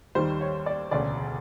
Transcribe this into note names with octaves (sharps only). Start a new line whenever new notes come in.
D#2 D#3 G3 C5
C#5
D5
E1 D2 C#3 D5